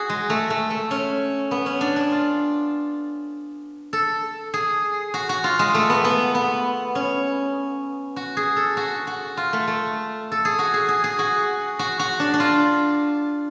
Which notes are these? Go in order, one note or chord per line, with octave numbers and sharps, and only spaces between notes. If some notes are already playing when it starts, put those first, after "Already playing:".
Already playing: F#4 G#4
G#3
A3
A3
A3
C#4
B3
C#4
D4
D4
F4
A4
G#4
F#4
F#4
F4
G#3
A3
B3
B3
B3
C#4
F#4
G#4
A4
F#4
F#4
F4
A3
A3
A4
G#4
F#4
G#4
G#4
G#4
F#4
F#4
F#4
D4
D4
F4